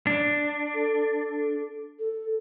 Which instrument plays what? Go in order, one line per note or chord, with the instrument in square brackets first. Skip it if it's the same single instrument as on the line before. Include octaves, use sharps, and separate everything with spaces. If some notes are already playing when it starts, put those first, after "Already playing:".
[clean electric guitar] D4
[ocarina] A4
A4